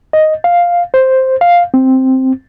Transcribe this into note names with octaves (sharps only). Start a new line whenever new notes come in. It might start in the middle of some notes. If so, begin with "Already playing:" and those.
D#5
F5
C5
F5
C4